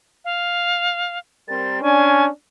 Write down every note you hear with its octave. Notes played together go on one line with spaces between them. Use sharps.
F5
G3 C4 A#4 A6
C#4 D4 G#5